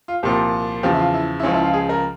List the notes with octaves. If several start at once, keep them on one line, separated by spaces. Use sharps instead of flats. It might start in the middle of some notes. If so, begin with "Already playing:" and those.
F4
C2 A#2 F3 G4
E2 C#3 F3 G4
E4
F4
E4
E4
C#2 C#3 F3 C#4
E4
F4
G#4
A#4